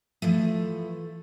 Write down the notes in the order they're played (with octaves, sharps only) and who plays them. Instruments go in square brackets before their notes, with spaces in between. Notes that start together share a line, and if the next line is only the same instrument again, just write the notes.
[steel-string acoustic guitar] E3 F3 A3